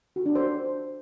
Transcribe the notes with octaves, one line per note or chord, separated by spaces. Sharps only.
F#4
D4
C5